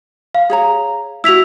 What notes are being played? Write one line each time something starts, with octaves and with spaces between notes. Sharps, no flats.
F5
G#4 C#5 A#5
E4 F#4 E6 B6 F7